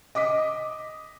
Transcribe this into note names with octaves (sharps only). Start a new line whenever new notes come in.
D#5 D6 D#6 B6